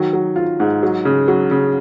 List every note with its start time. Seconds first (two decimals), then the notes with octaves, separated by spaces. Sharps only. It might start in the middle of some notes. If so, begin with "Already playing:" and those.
Already playing: D#3 F#3
0.13 F#3
0.36 F4
0.60 G#2
0.83 F#3
1.05 C#3
1.28 F#3
1.51 C#3